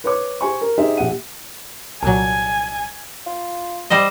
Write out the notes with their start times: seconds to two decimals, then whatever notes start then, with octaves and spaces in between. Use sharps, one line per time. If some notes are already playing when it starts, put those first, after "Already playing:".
0.04 B4 C#5 D6
0.41 G4 C5 G#5 C#6
0.61 A#4
0.78 D#4 G4 G#4 C5 E5
0.97 A#1 G4 E5 F#5 D#7
2.03 C2 A#2 F#3 G#5 A5
3.26 F4
3.90 G3 C5 D#5